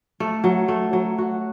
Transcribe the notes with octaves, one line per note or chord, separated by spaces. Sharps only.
A3
F#3
A3
F#3
F#4